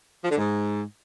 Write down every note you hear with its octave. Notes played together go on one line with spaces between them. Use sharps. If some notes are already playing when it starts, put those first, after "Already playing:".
F3
D3
G#2